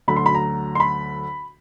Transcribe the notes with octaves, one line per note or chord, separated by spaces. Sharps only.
D2 D3 F#3 B5
C6
B5
A#5
C6
B5